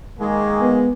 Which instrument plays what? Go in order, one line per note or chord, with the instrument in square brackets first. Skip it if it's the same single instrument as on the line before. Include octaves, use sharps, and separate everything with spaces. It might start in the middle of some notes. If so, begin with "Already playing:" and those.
[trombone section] D#3 A#3 G#4 [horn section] G#3
[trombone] B3